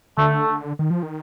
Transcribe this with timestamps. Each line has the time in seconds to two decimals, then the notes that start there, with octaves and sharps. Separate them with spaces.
0.18 D3 A3
0.79 D#3
0.90 F3
1.03 D#3